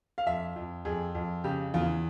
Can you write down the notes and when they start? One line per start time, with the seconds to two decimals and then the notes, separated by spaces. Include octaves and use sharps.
0.18 F5
0.26 F2 E5
0.56 F2
0.85 F2 G#4
1.15 F2
1.44 C#3 G4
1.74 E2 F4